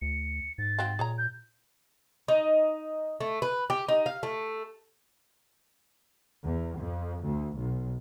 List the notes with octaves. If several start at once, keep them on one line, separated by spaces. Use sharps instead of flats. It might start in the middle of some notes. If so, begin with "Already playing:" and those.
D2 C#7
G#2 A6
C4 F#4 F5
A#2 G#4 C#5 A#5
G6
D#4
A3
B4
G4
D#4
F5
A3
E2
F2
D2
B1